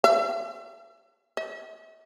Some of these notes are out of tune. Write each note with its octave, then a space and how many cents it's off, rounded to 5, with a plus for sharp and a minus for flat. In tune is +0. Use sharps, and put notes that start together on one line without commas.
E5 +40
E5 -45